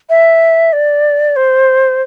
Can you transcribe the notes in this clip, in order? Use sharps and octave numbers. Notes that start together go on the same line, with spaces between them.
E5
D5
C5